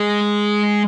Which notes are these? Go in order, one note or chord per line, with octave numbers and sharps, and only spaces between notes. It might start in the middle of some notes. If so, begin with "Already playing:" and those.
Already playing: G#3